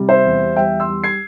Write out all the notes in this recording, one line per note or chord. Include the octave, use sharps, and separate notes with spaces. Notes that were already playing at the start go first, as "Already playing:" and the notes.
Already playing: C3 G3
C5 E5
E2
G3 E5 G5
C6 E6
G3
G#6 C7